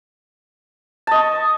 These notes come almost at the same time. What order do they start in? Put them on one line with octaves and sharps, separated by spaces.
A5 D#5 C#6